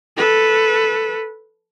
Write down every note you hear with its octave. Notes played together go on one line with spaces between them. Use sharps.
A4 B4